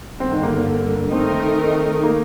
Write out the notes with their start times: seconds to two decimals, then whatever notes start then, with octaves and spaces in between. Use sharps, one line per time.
0.19 G1 G2 D3 C4
0.31 D#3
0.43 A#3
0.54 A#3
1.11 D#3 A3 C4 D#4 A#4
2.03 A#3